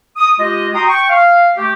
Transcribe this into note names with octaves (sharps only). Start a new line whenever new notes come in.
D#6
G#3 F4 G4 D#5
F#4 G5 A#5 C6 C#6 D#6
G5 C#6
F5
A3 G4